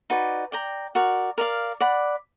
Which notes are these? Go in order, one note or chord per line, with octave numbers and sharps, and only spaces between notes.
D#4 F#4 B4 D5
D5 G5 A#5
F#4 A#4 D5
A#4 D5 F5
D5 F#5 B5